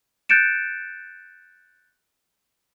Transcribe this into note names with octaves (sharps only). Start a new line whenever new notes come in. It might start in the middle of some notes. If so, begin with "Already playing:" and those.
F#6 G6 A6 C#7 D7 E7